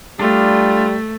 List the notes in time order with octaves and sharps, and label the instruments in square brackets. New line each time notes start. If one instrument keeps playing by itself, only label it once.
[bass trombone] G3 [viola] A3 [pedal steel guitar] D4 F4